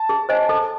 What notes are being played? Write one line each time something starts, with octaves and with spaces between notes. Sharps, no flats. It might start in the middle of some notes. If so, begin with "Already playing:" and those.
Already playing: A5
G#4
C5 D#5 G#5
A4 A5